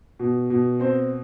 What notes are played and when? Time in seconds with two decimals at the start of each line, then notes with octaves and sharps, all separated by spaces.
0.20 B2
0.50 B2
0.80 C4 C5